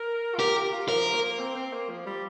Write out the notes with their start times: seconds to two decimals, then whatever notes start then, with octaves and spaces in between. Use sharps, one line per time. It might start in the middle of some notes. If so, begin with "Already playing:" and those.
Already playing: A#4
0.34 F4
0.39 G4 A#4
0.56 G4
0.73 F4
0.89 F3 A#4
1.14 A#3
1.39 C4
1.56 C4
1.73 A#3
1.89 F3
2.06 G3